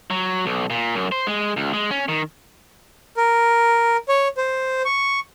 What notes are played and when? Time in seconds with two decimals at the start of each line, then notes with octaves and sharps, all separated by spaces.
0.10 F#3
0.46 B1
0.70 A#2
0.95 F#2
1.12 C5
1.27 G#3
1.57 C#2
1.73 G#3
1.91 C#4
2.08 D#3
3.17 A#4
4.09 C#5
4.37 C5
4.85 C#6